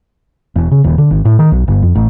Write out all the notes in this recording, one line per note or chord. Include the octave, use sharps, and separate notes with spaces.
E1
C#3
D#1
D3
G#1
A2
D#3
B1
G1
F2
A1